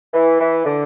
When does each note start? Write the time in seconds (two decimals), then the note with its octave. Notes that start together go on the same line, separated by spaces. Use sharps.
0.14 E3
0.40 E3
0.65 D3